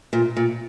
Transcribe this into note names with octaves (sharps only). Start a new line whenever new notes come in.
A#2
A#2